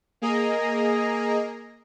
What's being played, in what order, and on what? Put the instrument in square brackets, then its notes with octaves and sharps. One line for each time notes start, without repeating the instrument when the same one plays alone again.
[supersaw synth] A#3 G#4 D#5 A#5